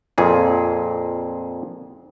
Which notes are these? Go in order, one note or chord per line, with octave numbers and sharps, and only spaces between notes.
F2 A#2 G#4